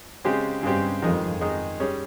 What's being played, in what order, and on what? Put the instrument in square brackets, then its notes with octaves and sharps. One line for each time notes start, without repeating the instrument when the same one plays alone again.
[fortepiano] C#3 G#3 C4 G4
[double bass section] G2 [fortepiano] C#3 G#3 C4 G4
[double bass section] F2 [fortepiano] D#3 G#3 D#4 G#4
[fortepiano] D#3 G#3 D#4 G#4
G3 C#4 G#4